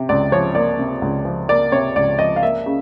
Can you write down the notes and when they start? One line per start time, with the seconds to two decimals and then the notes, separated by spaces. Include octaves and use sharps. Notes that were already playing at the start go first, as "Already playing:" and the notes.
Already playing: C3
0.09 C#2 D5
0.32 F3 C#5
0.55 A#3 D5
0.79 C3
1.02 C#2
1.25 F3
1.49 A#3 D5
1.72 C3 C#5
1.96 C#2 D5
2.19 F3 D#5
2.36 F5
2.43 A#3 E5
2.66 C#3